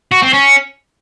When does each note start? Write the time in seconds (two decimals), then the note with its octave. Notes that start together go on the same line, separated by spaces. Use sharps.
0.12 F#4
0.23 C4
0.33 C#4